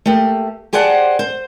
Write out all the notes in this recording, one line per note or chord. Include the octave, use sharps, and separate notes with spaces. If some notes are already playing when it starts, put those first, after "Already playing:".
A3 A#3 G4
G4 G#4 C5 D5 F#5 A5
C5